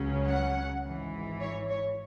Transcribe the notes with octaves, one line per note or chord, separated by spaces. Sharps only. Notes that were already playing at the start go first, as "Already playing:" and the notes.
Already playing: C#2 C#3 F#3 C#4
F#5
G#1 G#2 E3
C#5
C#5